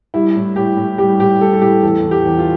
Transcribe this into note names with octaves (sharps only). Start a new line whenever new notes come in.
G3 E4
A2
A2 G4
A2
G3 G4
A2 G4
G3 A4
A4
A2 G4
E2 A4
E2
G4
E2
F4